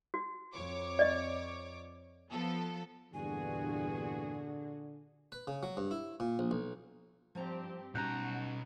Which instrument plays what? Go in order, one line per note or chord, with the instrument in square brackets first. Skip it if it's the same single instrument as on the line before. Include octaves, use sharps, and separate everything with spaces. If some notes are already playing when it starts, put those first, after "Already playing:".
[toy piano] F#4
[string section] F2 C#5 D6
[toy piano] D5 D#5
[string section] F3 B3 A4
[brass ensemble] E2 G2 [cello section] A#2 F#4 G#4 [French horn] D3 [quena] G#5
[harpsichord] B4
C#3
F#3
G2
E4
A#2
A#1
B1
[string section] G2 C4 G4 [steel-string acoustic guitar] F3 A5 A#5
[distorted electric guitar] B2 A#5 [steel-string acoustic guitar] G3 C#4 D#4 [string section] F#4 [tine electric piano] F#6 G6